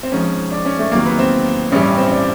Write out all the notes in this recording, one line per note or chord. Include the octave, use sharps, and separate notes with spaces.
C4
G#1 G#2 F3 C#4
D4
C#4
A3
E2 C3 D#3 F#3 A#3
B3
C4
A1 G2 E3 G3 C#4
C4
C#4
D4